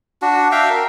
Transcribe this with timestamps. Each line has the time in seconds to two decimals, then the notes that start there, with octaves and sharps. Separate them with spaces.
0.22 D4 F#4
0.52 E5 F5 G5
0.70 A#4